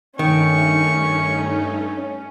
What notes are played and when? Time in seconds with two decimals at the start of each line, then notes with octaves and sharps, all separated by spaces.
0.19 G2 D#3 A3 C#4 D#4 C#6